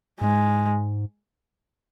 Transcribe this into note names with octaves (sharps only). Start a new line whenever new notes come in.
G#2 G#3